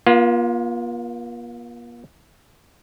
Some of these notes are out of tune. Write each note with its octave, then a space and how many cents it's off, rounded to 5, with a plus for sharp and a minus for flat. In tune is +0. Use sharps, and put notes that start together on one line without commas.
A#3 +45 F4 +0